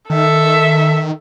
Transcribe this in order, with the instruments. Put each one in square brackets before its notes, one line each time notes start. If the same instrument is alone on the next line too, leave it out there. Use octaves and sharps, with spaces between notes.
[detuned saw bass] D#3 [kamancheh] A4 E5